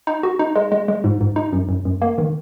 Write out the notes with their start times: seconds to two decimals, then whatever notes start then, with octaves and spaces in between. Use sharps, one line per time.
0.07 D#4
0.23 F#4
0.39 D#4
0.56 G#3
0.72 G#3
0.88 G#3
1.04 G#2
1.21 G#2
1.36 D#4
1.53 F#2
1.69 F#2
1.85 F#2
2.02 A#3
2.18 D#3